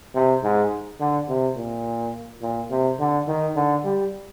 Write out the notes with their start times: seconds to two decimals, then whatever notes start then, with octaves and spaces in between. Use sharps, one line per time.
0.14 C3
0.43 G#2
1.00 D3
1.29 C3
1.56 A#2
2.42 A#2
2.70 C3
2.99 D3
3.28 D#3
3.56 D3
3.85 G3